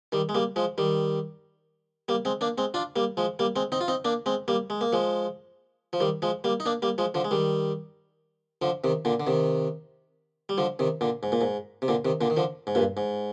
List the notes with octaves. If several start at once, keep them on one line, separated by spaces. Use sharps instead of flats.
D#3 G3
G#3
G3 A#3
F3 G#3
D#3 G3
G3 A#3
G#3 C4
A#3 D4
G#3 C4
D4 F4
G3 A#3
F3 G#3
G3 A#3
G#3 C4
C4 D#4
F4
C4 D#4
A#3 D4
G#3 C4
G3 A#3
G#3
A#3
F3 G#3
F3
D#3 G3
F3 G#3
G3 A#3
D#4
A#3 D4
G3 A#3
F3 G#3
D3 F3
G#3
D#3 G3
D3 F3
C3 D#3
A#2 D3
D3
C3 D#3
G3
D3 F3
C3 D#3
A#2 D3
G#2
A#2
G#2
C3
A#2 D3
C3 D#3
A#2 D3
D#3
D3 F3
G#2
G2 A#2
G#2